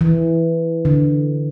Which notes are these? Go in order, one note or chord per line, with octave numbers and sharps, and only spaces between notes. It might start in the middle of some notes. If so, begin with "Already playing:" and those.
E3
D3